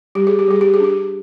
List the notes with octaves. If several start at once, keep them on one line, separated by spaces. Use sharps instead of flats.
G3 G4
G#4
G4
G3 G#4
G4
G#4
D4 G4